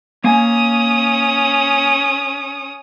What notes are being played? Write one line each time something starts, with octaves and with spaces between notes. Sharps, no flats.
A#3 C#4 G#5 D#6